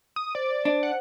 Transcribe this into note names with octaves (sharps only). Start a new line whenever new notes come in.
D#6
C5 D5
D4
F#5